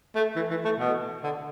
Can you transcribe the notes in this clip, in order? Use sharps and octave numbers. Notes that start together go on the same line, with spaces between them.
A3
E3
E3
A3
B2
D3